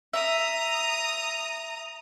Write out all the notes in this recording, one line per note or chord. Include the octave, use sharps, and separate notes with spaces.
E5 A#5 D#6